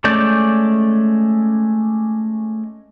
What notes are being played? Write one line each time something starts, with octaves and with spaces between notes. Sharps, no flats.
G#3 A3 C#4 D5 G6